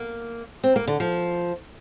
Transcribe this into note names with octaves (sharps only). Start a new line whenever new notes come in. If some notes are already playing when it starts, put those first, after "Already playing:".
Already playing: A#3
C4
A#3
D3
F3